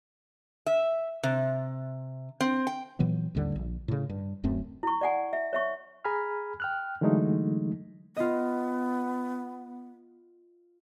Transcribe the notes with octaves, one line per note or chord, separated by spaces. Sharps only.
E5
C3
C4
G5
A#2 E3 F#3 B3
A1 D#2 D3 G3
A#1
A2 C#3
G2
D1 F#2 A3 C4
E4 C#6
D5 F#5 G#5
E5
C#5 E5 C#6
G#4 G#5 A#5 B5 F6
G5 F6 F#6
D3 E3 F#3 G#3 A3 D#4
B3 F4 D#5